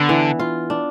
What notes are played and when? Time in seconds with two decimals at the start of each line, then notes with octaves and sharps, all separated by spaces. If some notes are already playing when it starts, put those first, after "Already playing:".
Already playing: D3 B3 D4
0.09 E3
0.39 F4
0.70 D4